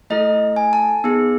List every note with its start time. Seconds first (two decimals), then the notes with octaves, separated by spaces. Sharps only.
0.10 A3 E4 A4 D#5
0.56 G#5
0.73 A5
1.04 B3 D#4 G#4